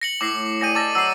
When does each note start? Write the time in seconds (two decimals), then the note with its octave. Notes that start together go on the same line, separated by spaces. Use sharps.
0.01 A#6 C#7 F#7
0.21 A2 D6 A#6 C7
0.61 G4 G#4 D5 A#6 D#7
0.75 A4 D#5 D6 A6 A#6
0.95 F#3 E6 C7